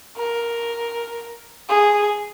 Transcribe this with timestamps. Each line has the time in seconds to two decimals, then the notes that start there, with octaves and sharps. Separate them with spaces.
0.17 A#4
1.69 G#4